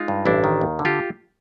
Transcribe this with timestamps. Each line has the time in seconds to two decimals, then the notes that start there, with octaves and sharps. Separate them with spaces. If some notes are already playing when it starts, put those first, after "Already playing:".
Already playing: G#3 D#4 F4
0.08 G2
0.25 A1 D4 E4
0.44 D#3
0.61 D#2
0.79 D3
0.85 F4 G4